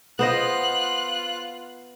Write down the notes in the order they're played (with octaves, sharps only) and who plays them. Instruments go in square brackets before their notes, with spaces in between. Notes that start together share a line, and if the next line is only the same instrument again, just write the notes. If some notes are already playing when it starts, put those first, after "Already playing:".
[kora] B3 C5 D#5 [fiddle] F4 F#6